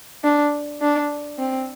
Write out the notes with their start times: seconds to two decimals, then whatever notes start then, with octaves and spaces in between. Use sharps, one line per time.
0.24 D4
0.82 D4
1.39 C4